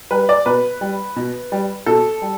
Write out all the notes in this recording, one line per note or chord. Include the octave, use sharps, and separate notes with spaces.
G3 B4
D5
B2 B4
G3
B2
G3
B2 A4
G3